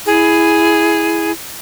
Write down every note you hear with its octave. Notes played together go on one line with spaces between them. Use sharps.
E4 G#4